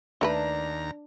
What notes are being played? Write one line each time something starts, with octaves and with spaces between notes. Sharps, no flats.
D#2 A3 D4 A#4 B4 A#5